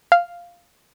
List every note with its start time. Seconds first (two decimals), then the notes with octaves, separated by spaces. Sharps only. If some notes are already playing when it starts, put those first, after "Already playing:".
0.12 F5